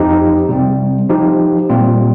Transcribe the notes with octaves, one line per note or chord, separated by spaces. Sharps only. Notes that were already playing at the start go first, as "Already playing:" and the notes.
Already playing: F2 F3 D#4 G4
C3 G3 C4
F3 D#4 G4
A#2 G3 C4 F4